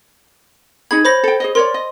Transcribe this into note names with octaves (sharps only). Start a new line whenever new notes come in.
D#4 G#4 B5 G#6
C5 C#5 B5 A#6
A4 G5
G#4 C#5 D#5
A#4 C#5 D5 C6
D#5